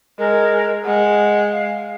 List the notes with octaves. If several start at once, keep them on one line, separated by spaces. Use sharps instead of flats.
G#3 A#4
G#3 F#5
F5